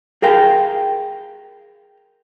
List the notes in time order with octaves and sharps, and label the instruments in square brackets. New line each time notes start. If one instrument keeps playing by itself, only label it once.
[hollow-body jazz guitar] G#4 A#4 F5 G5